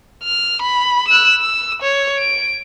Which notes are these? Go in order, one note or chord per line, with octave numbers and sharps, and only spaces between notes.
F6
B5
E6 F#6
E6
C#5
D7